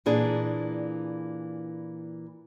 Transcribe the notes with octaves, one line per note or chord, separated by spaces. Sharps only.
A#2 E3 D4 G#4